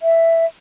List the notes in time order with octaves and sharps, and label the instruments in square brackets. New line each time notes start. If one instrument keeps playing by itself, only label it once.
[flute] E5